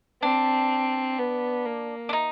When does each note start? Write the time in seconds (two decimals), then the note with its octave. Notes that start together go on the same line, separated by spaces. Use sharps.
0.22 C4 D4
1.19 B3
1.66 A#3
2.09 D4
2.13 D#4